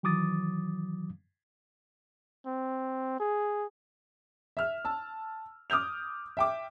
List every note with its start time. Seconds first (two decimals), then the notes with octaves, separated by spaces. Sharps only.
0.03 D#3 E3 F#3 D6 D#6 A6
2.46 C4
3.20 G#4
4.57 E5 F6
4.85 A5 E6
5.70 D6 D#6 F6 G6 F7
6.37 E5 G5 D6